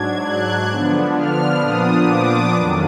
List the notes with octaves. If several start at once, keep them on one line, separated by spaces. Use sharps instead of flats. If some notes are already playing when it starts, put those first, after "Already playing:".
Already playing: G#2 F#3 D4 G#6
F#6
D3 F3 B3 D4
F6
A#2 F3 B3 D4 D#6
D6
F2 D#3 F#3 D4